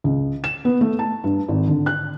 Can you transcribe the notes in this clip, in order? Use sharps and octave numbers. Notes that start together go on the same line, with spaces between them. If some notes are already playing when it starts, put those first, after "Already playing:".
C#2
E7
B3
A3
A5
G2
G#1
D3
F#6